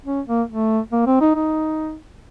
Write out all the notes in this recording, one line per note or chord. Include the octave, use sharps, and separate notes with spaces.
C#4
A#3
A3
A#3
C4
D#4
D#4